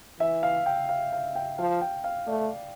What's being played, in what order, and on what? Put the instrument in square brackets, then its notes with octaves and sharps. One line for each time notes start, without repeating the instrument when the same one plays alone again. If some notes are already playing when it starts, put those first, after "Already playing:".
[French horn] E3 [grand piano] E5
[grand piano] F5
G5
F5
F5
G5
[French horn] F3 [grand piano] F5
[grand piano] G5
F5
[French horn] A3 [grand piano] D5